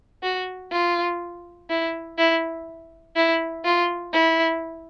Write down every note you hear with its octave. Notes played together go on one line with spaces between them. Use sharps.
F#4
F4
E4
E4
E4
F4
E4